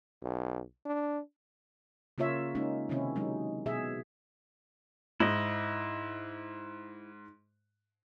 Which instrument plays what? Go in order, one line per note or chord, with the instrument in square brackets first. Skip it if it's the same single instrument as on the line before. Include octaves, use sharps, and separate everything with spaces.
[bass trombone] B1
D4
[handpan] C#3 A#3 F4 C#5 E5
G#3 A#3 C#4 D#4
C3 D#3 C4 C#4 E4
F#3 G#3 D#4
B2 G#4 E5
[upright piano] G#2 [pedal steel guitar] E4 D#5